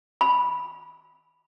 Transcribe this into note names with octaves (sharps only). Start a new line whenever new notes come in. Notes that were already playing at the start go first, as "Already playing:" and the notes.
B5